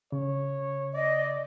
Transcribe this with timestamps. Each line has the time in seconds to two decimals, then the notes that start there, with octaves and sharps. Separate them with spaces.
0.12 C#3 C#5
0.94 D5 D#5